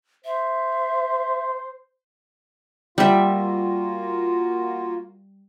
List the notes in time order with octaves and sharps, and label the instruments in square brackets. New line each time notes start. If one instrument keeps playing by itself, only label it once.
[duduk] C5 [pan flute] E5
[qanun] G3 E5 [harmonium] A#3 F4 F#4